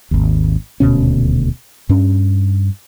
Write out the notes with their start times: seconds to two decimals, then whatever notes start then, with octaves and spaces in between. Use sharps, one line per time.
0.11 G#1 D#2
0.80 D#1 D2 B2 C#4
1.89 G2 C#4